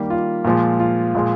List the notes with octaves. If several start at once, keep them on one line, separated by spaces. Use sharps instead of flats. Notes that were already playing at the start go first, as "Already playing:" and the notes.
Already playing: D#3 G3 A#3 G4
F4
A#2 F3 G#3
F4
A#2 F3 G#3